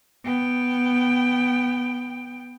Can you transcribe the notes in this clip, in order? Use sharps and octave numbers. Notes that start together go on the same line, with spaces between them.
B3 G5